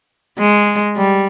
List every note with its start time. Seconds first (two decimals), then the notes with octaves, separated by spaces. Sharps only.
0.39 G#3
0.97 G3